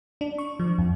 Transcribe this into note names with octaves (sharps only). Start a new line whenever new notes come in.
D4
C#6
F3
F2